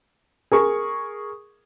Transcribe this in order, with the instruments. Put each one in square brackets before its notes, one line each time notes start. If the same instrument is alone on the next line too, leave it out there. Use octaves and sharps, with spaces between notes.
[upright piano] G#4 A#4 C#6